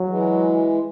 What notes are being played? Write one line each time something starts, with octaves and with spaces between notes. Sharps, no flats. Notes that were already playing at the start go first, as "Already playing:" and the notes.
Already playing: F#3
E3 G#3